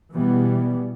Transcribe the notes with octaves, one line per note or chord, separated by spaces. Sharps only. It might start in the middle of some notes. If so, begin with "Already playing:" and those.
B2 E3 G3 B3